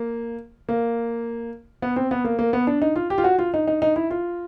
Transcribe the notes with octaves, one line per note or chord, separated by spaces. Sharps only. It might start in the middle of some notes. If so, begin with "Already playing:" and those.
Already playing: A#3
A#3
B3
C4
B3
A#3
A#3
B3
D4
D#4
F4
G4
F4
F#4
F4
D#4
D#4
D#4
E4
F4